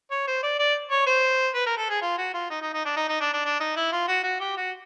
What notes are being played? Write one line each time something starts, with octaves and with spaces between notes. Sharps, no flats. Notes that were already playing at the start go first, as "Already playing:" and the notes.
C#5
C5
D5
D5
C#5
C5
B4
A#4
A4
G#4
F4
F#4
F4
D#4
D#4
D#4
D4
D#4
D#4
D4
D4
D4
D#4
E4
F4
F#4
F#4
G4
F#4